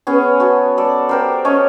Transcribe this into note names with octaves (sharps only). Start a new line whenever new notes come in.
B3 C#4 G#4
F#4 A5
A4 D5
G4 A#4 C5
C#4 A4 C#5 D#5